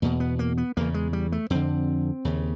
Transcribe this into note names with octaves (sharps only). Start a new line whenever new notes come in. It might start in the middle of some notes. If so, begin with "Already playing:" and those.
E2 B2 A#3
B3
A#3
B3
E2 C#3 A#3
G#3
G3
A3
F2 D3 C4
D#2 C#3